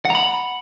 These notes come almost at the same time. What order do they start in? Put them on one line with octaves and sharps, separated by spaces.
F#5 A#5 B5